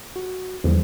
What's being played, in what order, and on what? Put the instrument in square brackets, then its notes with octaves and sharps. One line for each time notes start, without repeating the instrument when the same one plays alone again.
[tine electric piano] F#4
[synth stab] E2 [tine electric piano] D3 F3 G3